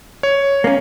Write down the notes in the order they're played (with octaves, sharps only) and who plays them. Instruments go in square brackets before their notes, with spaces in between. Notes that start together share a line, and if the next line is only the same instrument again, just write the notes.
[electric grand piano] C#5
[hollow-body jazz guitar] A#3 C#4